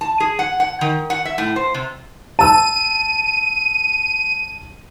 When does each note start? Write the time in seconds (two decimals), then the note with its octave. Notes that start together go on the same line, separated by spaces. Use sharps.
0.01 A5
0.20 G#4
0.39 F#5
0.60 F#5
0.81 D#3
1.10 F#5
1.25 E5
1.38 A2
1.56 C5
1.74 C3
2.39 A5 E6 D#7